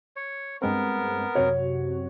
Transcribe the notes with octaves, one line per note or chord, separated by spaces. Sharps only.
C#5
G2 G#3 B3 C4 A#4
F#2 C3 F#4 C#5